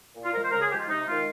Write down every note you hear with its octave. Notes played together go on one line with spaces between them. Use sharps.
A#2
F4
F3 G#3 A#4
C5
C#3 A#4
G#4
F3 G#3 G4
F4
C3 D#4
D#3 G#3 F4